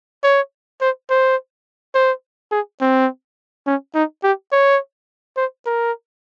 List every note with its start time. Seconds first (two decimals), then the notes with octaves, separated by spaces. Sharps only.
0.24 C#5
0.81 C5
1.10 C5
1.94 C5
2.51 G#4
2.81 C4
3.66 C#4
3.95 D#4
4.23 G4
4.52 C#5
5.37 C5
5.66 A#4